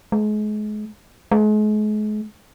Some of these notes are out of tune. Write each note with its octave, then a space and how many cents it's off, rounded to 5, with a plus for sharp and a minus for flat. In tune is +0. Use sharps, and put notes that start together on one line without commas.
G#3 +35
G#3 +40